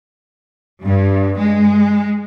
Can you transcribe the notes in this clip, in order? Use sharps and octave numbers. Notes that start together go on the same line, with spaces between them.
G2
G#3